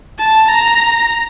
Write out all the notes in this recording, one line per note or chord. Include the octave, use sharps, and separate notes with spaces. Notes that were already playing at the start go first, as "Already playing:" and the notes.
A5
A#5